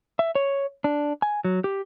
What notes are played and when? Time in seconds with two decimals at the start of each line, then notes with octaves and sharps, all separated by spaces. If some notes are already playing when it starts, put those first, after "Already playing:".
0.19 E5
0.35 C#5
0.84 D4
1.22 G#5
1.45 F#3
1.64 G4